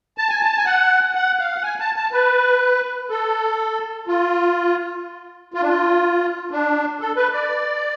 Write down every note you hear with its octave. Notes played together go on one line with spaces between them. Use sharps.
A5
G#5
A5
G#5
F#5
F#5
F5
F#5
G#5
A5
A5
B4
A4
F4
F4
D4
F4
D4
A4
B4
D5